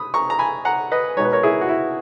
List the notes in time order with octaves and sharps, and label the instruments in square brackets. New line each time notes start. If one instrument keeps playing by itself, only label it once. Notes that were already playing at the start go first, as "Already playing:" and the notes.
Already playing: [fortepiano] B5 D#6
A#5 C#6
A#5
G#5 B5
F#5 A#5
B4 D#5
B2 G#3 D#4 C#5
B4
A#4 C#5
E4 G#4
F#4
E4